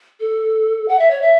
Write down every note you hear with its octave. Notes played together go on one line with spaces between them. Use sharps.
A4
F#5
E5
C#5
E5